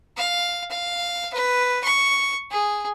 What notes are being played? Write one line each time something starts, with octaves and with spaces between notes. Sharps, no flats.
F5
F5
B4
C#6
G#4